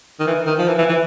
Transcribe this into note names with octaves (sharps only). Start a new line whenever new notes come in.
D#3
E3
D#3
F3
E3
E3
E3